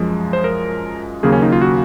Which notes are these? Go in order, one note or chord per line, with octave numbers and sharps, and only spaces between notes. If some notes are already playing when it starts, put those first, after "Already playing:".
Already playing: F#2 F3 G#3
C5
A#4
D#2 C#3 F#3 A#3 G#4
C#4
D#4
F4
F#4